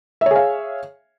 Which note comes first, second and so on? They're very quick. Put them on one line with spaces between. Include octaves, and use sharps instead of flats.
E5 C#5 G#4 F5